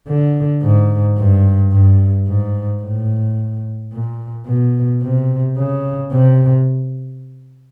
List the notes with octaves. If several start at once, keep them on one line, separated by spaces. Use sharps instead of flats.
D3
G#2
G2
G2
G#2
A2
A#2
B2
C3
C#3
C3